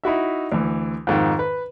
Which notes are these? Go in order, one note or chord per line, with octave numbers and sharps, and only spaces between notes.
D#4 E4 F#4 E5
D2 E3
F2 G#2 D#3
B4